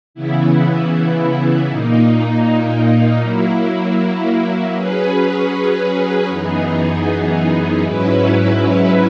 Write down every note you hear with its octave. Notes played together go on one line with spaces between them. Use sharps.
C#3 E3 B3 E4
A#2 A#3 D#4
F#3 A#3 E4
F#3 C#4 G#4 B4
F#2 E3 B3 D#4 G#4
G#2 F#3 C#4 E4 B4